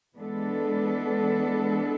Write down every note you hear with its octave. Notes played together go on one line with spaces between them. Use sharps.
E3 G#3 B3 D4 A4